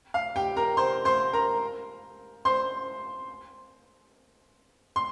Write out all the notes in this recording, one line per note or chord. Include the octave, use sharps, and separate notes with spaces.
F5
G4 G5
A#4 A#5
C5 C6
C5 C6
A#4 A#5
C5 C6
C6